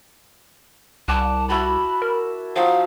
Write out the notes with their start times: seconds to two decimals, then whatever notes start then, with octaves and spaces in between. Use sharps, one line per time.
1.08 C2 F#5 A5 D6
1.49 E4 F#4 A5 B5
2.02 A#4
2.56 F3 F#3 D#4 F5